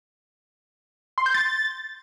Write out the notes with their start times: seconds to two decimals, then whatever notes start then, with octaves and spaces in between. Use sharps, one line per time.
1.18 C6
1.26 G6
1.34 A6